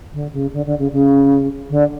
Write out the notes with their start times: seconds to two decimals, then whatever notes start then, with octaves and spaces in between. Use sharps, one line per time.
0.13 D3
0.32 C#3
0.53 D3
0.65 D3
0.78 C#3
0.92 C#3
1.69 D3